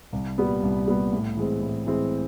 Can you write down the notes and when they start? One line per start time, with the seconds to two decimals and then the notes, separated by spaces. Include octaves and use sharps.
0.13 C2
0.38 A#2 G3 B3
0.63 C2
0.87 A#2 G3 B3
1.13 A2
1.37 E3 G#3 C4
1.62 A2
1.86 E3 G#3 C4